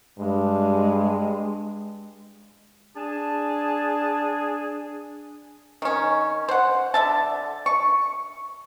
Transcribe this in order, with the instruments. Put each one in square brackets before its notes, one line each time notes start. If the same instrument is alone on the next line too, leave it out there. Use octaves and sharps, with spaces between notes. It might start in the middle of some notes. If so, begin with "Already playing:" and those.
[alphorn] G2 [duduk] G#3
[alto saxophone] D4 [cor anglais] G#4 [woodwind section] A5
[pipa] D#3 C#4
C5 F#5
D3 E5 A5
C#6